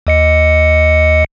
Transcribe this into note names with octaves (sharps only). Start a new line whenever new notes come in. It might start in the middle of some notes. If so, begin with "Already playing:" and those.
D#2 D#5 C#7